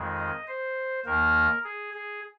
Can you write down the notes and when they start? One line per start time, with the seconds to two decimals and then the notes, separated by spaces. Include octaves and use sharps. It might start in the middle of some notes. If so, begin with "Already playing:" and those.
Already playing: F2 D#3 G#3
0.18 D#5
0.47 C5
1.05 D#2 D#3 A#3 A#4
1.63 G#4
1.94 G#4